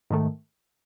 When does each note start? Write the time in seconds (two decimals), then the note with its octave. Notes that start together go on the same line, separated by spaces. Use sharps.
0.10 G#2 D#3 A3